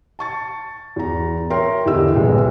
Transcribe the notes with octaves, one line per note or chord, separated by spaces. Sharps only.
A5 C#6 A6
E2 A#5
A#4 C#5 E5 G5 A#5 C6
E2 D3 E4 G4 D#5 E6
D#1 C2 G#3 B4